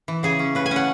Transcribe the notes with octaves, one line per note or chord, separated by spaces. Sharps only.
E3
C#3 G#4
C#4
C#3 B4
G#5
C#4 F#5